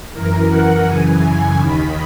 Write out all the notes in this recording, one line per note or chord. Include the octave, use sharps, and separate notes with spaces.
F#2 E3 A#4
F#5
F#2 C#3 E3 G#5
G#5
D#2 D#3 B5